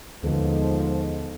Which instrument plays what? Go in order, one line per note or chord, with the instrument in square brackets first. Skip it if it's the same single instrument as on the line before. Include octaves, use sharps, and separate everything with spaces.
[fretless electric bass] D#2 D3 D#3 [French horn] G#2 [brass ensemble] F3 [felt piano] B3 A4